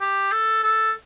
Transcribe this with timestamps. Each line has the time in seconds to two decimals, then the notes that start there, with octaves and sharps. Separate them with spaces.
0.01 G4
0.32 A4
0.63 A4